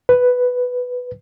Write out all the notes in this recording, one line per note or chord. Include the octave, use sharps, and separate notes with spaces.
B4